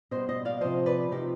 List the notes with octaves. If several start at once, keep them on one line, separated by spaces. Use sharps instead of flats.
B2 G3 C5 D#5
C5 D#5
D5 F5
C3 F3 C5 D#5
B4 D5
C3 F3 D#4 G4